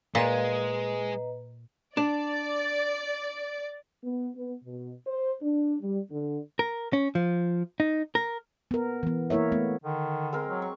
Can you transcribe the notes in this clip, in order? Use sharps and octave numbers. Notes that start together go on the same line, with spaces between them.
A#2 G#3 B4 D#5 A#5
D4 D5
B3
B3
B2
C5
D4
G3
D3
A#4
C#4
F3
D#4
A#4
B3 A#4
E3 B3
A#3 E4 A#4 C#5 E5
A3 B3
D3 D#3
G#3 C4 A#4
F#3
C#6